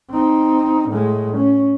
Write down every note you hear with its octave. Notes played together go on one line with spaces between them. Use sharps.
C4 D#4
A2 G#3
C#4